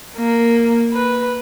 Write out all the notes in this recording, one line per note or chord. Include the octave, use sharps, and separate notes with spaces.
A#3
B4